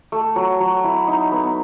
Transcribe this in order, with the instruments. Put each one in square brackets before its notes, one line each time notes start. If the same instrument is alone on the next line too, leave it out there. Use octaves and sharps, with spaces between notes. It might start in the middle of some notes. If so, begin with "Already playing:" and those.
[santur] A3
F#3
F#3
E4
D#4
B3